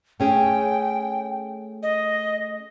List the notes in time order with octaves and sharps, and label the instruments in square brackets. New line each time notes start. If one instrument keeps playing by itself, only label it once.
[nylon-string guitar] A3 C#4 G#4 [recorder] G5
[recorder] D#5